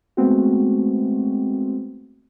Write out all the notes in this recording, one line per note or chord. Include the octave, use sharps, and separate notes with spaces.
G#3 A3 B3 C4 F#4